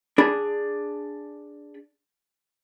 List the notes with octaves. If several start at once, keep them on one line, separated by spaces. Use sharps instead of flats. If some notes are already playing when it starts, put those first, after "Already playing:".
D4 G#4 B5